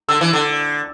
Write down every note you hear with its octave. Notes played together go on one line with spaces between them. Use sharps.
D3 E6
E3
D3